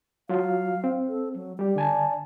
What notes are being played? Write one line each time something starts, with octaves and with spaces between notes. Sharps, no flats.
F#3 F4 F5
C4
A4
F#3
G3 G4 D5
D3 G#5 A5